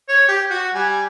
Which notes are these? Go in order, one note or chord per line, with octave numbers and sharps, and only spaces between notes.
C#5
G4
F#4
G3 G#5